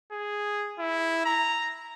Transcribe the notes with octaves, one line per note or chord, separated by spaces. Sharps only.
G#4
E4
A#5